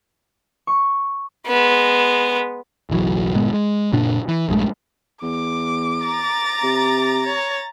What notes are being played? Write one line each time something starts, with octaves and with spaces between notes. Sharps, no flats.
C#6
G#3 B3
F#1 B1 E3 F#3
G1 A#2 G#3 B3
G#3
F#1 A#2 D4
E3
A#1 G2 G#3 A3
E2 D6
A#5 A6
C3
C#5